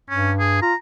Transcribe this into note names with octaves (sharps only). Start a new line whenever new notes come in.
G2 C#4
G#4
F4 A#5